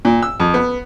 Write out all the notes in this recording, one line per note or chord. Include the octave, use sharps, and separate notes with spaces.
A#2
E6
F2
B3